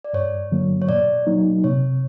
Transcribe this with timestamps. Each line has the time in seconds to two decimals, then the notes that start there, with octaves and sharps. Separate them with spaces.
0.04 D5
0.13 G2 C#5
0.52 D3 F#3 A#3
0.82 C#5
0.89 A#2 D5
1.27 F#3 A#3 D#4
1.64 C3 C#5